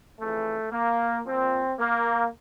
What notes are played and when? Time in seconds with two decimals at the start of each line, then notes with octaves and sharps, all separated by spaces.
0.19 F2 C#3 E3 A3
0.72 A#3
1.26 A#2 F3 C4
1.79 A#3